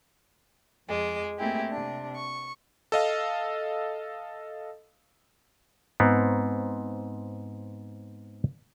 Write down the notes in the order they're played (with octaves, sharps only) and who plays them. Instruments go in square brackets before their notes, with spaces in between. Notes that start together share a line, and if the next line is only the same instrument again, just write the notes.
[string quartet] F2 G#3 D6
A3 A#3 C4 E4 G4 G#4
C3 D4
C#6
[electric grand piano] A4 D#5 F5
[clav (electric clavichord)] G#2 B3 C4